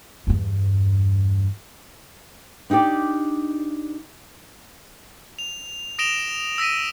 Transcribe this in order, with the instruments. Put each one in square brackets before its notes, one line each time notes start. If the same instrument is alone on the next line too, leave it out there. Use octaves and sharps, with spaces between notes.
[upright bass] E2 G2
[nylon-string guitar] D4 D#4 F#4 G4 D5
[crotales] F7
D#6 A#6 D7 E7 F7 G7
E6 A#6 B6 D#7